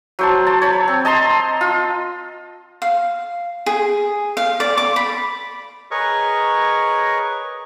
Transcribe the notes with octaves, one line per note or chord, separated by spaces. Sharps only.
F#3 C5 A5
A5
C#5 B5
C4
D#5 A5 A#5 C6
F4
F5
G#4
F5
D5
D6
B5
G#4 A#4 B4 C#5 D#5 C#6